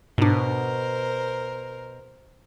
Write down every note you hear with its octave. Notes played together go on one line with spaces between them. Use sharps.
G#2 B2 D4 A#4 C5